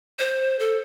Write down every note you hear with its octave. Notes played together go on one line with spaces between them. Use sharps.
C5
A4